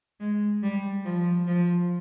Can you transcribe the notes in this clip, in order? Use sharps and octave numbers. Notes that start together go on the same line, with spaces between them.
G#3
G3
F3
F3